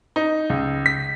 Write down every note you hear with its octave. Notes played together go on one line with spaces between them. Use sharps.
D#4
C#2
B6